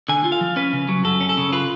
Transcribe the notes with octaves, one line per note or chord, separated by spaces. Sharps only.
D3 G#5
F4
F5
F3
C#4 B4
C#3
F#3
F#2 A4
C#4
A4
C#3
F4 B4